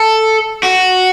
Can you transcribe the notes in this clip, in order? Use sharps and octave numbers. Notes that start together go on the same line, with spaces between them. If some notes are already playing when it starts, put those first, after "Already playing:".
Already playing: A4
F#4